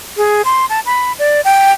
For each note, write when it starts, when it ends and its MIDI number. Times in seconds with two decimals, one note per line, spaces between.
0.17 0.42 68
0.45 0.66 84
0.69 0.80 81
0.86 1.13 83
1.19 1.41 74
1.44 1.73 79